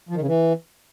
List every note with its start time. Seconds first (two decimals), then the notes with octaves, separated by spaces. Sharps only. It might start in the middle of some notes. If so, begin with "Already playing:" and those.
0.09 F3
0.15 D#3
0.21 C#3
0.27 E3